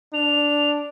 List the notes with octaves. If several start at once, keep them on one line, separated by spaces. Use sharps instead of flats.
D4 F7